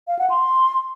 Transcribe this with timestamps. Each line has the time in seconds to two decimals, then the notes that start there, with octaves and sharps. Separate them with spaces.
0.08 F5
0.19 F#5
0.30 C6